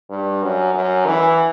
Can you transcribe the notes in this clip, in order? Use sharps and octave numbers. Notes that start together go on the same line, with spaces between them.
G2
F#2
F#2
E3